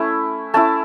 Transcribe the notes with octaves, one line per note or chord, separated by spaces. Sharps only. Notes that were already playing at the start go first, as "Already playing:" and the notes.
Already playing: A3 C#4 E4
A3 C#4 E4 A5